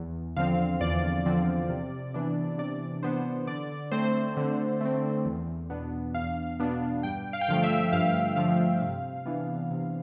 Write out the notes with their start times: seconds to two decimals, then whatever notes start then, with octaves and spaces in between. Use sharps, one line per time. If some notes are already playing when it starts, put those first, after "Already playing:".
Already playing: E2
0.36 D3 F3 C4 F5
0.81 E2 D5
1.26 D3 F3 C4
1.70 C3
2.14 E3 B3 D4
2.58 C3 D5
3.03 E3 B3 D4 C5
3.47 D3 D5
3.92 A3 C4 C5
4.37 D3
4.81 A3 C4
5.25 E2
5.70 B2 B3 D4
6.14 E2 F5
6.60 B2 B3 D4
7.03 G2 G5
7.33 F5
7.41 G5
7.48 D3 F3 A3 F5
7.63 E5
7.93 G2 F5
8.36 D3 F3 A3 F5
8.81 C3
9.25 E3 B3 D4
9.71 C3